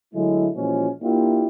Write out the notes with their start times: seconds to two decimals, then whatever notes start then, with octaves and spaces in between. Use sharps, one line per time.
0.14 D3 F#3 G#3 A3 E4
0.55 A#2 E3 F3 G#3 C#4 F#4
1.01 A#3 D4 E4 F4 G4